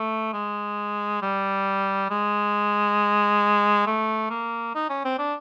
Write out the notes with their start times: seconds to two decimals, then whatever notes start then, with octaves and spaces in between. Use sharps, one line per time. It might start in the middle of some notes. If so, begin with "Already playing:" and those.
Already playing: A3
0.33 G#3
1.22 G3
2.10 G#3
3.86 A3
4.30 A#3
4.75 D#4
4.90 C#4
5.05 C4
5.19 D4